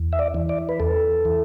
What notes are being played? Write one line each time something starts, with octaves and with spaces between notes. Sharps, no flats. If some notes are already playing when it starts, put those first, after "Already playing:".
Already playing: E2
E5
D5
E3
D5
B4
E2 A4
E3